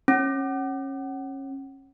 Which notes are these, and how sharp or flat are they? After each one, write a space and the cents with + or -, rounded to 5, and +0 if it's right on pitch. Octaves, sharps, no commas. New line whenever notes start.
C#4 -25